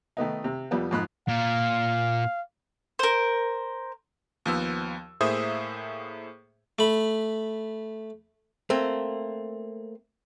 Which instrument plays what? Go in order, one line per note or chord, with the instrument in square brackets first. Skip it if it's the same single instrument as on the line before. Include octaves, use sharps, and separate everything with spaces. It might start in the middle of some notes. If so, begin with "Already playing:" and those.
[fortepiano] D#3 A3 B3 D#4
C3
F2 G3 B3
F2 G#2 B5 F#6
[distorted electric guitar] A#2 [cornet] F5
[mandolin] A#4 C5
[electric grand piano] D#2 F3 B3 E6
A2 A#3 G#4 C5 E5 D#6
[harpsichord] A3 B5
[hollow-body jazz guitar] A3 A#3 C4